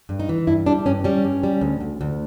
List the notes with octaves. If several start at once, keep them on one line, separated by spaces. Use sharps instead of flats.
G2
D#4
E3
G2 E4
G3 D4
G2 C#4
G3 C#4
G2
G3
D2
D2
D2